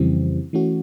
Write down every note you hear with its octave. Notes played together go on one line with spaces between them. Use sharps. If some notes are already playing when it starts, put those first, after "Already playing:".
Already playing: F2 C#3 E3 G3 C4
E3 A3 C#4 F#4